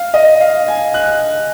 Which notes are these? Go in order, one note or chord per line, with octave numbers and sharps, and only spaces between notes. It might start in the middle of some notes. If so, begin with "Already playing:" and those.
Already playing: F5
D#5
F5
G#5
F#6